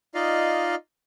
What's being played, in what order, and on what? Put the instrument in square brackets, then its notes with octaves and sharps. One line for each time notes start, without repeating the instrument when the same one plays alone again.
[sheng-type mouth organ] D#4 F4 D5 D#5 F5